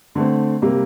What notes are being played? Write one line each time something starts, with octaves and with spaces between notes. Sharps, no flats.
D3 A3 C4
C3 G3 A#3